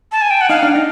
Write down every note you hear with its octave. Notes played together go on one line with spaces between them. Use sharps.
A5
G#5
G5
F#5
D#4 F5
D4
D#4